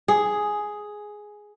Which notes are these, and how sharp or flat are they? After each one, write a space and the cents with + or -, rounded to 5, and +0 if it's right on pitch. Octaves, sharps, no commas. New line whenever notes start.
G#4 +5